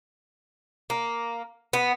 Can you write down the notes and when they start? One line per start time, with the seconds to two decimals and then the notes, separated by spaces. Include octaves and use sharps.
0.90 A#3
1.73 B3